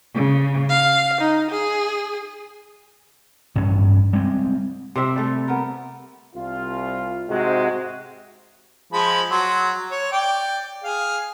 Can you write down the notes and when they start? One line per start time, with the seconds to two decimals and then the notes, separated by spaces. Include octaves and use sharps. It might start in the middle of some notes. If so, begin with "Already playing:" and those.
0.16 C#3
0.71 F5
1.21 D#4
1.50 G#4
3.55 A1 G2 C#4
4.13 G3 G#3 C4
4.96 C3 C4 E5
5.16 G3 A3
5.48 B3 A#4
6.36 C2 F4
7.29 G#2 C3 G#3 C4 F#4
8.93 F3 G#3 B5
9.31 F#3 C6
9.91 C#5
10.12 D5 G5
10.84 G#4 F5